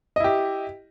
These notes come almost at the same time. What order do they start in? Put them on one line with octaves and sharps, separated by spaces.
D#5 E4 G4